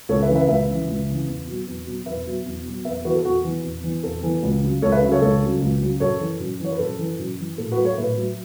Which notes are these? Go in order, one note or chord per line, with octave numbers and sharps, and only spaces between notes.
C#2 A4 C#5
B4 E5
C#3 E3
B4 E5
C#2 B4 E5
C#3 E3
C#2
C#3 E3
E2
B2 F#3
E2
B2 F#3
E2 B4 E5
B2 F#3
E2
B2 F#3
E2 B4 E5
E3 F#4 B4
A4
E2 F#4
E3
E2
E3
E2 A4
E3
C#2
C#3 F#3
C#2 A4 C#5
B4 E5
C#3 F#3
A4 C#5
C#2 A4 C#5
C#3 F#3
C#2
C#3 F#3
F#2 A4 C#5
E3
F#2
E3 C#5
B4
F#2 A4
E3
F#2
E3
A2 A4
F#4 B4
F#3
A4 C#5
A2 B4 E5
F#3